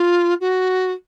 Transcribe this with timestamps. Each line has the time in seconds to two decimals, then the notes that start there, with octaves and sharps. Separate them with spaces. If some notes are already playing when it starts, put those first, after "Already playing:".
Already playing: F4
0.41 F#4